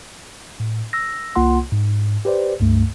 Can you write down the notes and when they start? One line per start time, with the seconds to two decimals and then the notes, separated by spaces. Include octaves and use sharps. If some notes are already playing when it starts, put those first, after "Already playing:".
0.60 A2
0.93 E6 A#6
1.36 C2 A#3 F4 F#5 C6
1.72 G#2
2.25 G4 B4 C5 D5
2.60 C#2 G2 A3